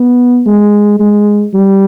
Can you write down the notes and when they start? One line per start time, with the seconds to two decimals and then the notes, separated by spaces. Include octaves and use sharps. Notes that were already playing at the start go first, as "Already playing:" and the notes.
Already playing: B3
0.46 G#3
0.99 G#3
1.53 G3